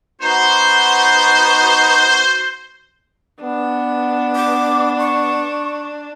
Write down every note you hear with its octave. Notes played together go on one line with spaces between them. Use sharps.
B3 D#4 F#4 C5
B3 D4
D6
C#6